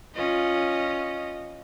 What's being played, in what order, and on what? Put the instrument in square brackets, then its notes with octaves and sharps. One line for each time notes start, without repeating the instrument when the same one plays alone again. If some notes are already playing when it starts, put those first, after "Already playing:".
[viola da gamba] C#4 F4 D#5